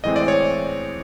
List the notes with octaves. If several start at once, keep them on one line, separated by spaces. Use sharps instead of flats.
A2 E3 G#3 C4 D#5
D5
C#5
D5